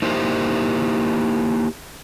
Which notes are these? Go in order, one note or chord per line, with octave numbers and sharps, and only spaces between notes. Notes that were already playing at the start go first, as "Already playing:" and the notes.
A#3 D#4 E4 G4 C5